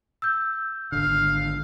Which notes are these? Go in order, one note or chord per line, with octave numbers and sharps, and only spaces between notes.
E6 G6
G#1 D3 F5